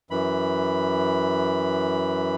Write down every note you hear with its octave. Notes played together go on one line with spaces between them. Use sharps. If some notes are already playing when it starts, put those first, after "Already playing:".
F#2 E3 B5